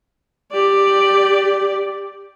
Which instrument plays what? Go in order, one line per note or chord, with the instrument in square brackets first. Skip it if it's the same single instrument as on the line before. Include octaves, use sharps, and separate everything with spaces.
[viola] G4 D5